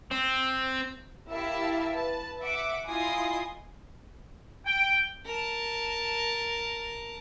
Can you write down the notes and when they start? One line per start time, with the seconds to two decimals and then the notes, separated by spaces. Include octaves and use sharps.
0.11 C4
1.30 E4 G4 A#4 E5 F5 A5
1.92 B4 A5
2.41 E5 F#5 D6
2.86 E4 F4 D#5 G#5 C6 D#6
4.65 G5
5.26 A#4 A5